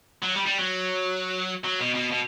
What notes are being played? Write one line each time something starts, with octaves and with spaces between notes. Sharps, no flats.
F#3
G3
G3
F#3
F#3
B2
B2
B2